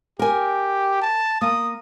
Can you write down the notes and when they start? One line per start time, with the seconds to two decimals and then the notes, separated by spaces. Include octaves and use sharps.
0.19 G4 A#4 G#5
1.02 A5
1.41 A#3 D#6